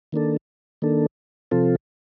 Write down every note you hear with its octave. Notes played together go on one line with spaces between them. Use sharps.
D#3 A#3 D4 A4
D#3 A#3 D4 A4
C3 F3 C4 F4 A4